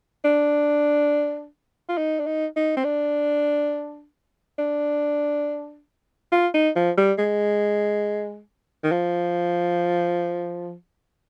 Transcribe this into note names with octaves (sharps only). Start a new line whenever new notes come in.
D4
F4
D#4
D4
D#4
D#4
C4
D4
D4
F4
D#4
F3
G3
G#3
D#3
F3